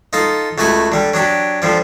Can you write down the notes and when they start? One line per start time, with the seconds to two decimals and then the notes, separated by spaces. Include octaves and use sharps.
0.13 D#4 F4 A4 A5
0.58 C#2 A3 F#4 G#5 B5 C#6
0.92 D3 G3
1.14 F#3 D4 G4
1.62 D3 F3 G3